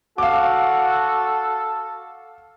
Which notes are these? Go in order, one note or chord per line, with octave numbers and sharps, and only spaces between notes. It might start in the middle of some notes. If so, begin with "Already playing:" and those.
F#4 A4 F5 D6